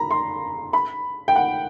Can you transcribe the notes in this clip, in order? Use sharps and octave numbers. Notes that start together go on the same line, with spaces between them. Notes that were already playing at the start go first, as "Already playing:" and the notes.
Already playing: A#5 B5
C6
B5
G5
F#5